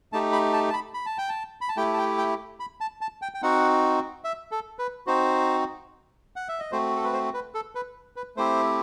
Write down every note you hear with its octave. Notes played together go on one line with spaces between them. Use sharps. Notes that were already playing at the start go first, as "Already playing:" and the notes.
A3 D#4 G4 A5
B5
A5
A5
B5
B5
A5
G5
A5
B5
A5
A3 E4 G4 G5
A5
G5
G5
B5
A5
A5
G5
G5
C4 D#4 F#4 F#5
E5
A4
B4
C4 D#4 F#4 C5
F#5
E5
D#5
A3 C4 F#4 C5
A4
B4
C5
B4
A4
B4
B4
A3 C4 E4 G4 C5